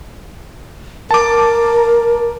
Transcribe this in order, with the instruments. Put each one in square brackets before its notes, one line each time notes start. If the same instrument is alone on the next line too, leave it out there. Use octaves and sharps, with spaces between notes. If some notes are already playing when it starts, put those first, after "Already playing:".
[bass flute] A#4 [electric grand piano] A5 D6